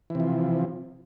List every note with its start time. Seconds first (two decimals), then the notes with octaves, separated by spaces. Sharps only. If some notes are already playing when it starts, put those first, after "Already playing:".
0.10 E3
0.15 C3
0.20 F3